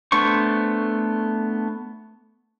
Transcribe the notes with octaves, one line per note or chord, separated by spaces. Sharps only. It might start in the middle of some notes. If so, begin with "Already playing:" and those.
A3 B3 D4 C5 C#6